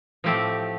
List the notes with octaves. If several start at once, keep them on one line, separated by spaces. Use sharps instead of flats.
A2 F3 A3 C4 G4